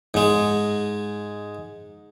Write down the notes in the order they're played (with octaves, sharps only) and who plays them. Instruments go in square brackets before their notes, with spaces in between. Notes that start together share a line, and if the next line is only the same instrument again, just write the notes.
[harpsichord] G#2 G#3